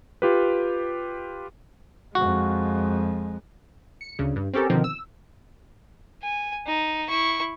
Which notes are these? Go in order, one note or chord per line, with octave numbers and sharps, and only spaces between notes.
F4 G4 B4
F2 G#3 F#4
C#7
D2 C#3
G2
C4 C#4 G4 A4 A#4
B2 D3 D#3 F3 C4
E6
G#5
D#4
E4 C#6